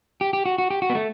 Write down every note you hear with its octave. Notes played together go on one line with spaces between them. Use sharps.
G4
G4
F#4
F#4
G4
F#4
B3
A3